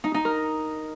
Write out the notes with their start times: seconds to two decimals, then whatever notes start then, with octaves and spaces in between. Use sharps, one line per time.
0.04 D#4
0.14 D#4
0.25 A#4